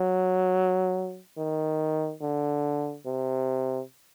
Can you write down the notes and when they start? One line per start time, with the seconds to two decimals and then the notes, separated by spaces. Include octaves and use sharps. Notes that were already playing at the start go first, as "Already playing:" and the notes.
Already playing: F#3
1.38 D#3
2.21 D3
3.05 C3